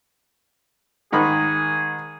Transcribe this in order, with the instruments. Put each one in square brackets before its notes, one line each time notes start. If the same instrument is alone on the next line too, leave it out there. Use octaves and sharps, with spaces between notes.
[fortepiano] G#2 D#3 B5 [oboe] G#4